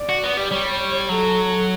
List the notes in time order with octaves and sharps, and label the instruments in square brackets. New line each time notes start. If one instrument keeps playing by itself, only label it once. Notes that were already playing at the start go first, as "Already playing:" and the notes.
Already playing: [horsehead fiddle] D5
[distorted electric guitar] F#4
B3
G3
[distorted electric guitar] G3 [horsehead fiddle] C#5
[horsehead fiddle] C#5
[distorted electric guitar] F#3 [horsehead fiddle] A4